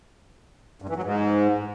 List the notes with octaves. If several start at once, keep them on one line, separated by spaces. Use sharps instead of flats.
G2
E3
F#3
G#2